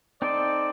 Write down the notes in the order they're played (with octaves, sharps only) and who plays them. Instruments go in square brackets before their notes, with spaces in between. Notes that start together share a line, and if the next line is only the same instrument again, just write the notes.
[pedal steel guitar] C4 D#4 A4 C5 [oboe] D5